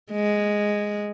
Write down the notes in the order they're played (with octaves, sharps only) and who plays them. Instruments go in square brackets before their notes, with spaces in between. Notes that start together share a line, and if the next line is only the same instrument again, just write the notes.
[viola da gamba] G#3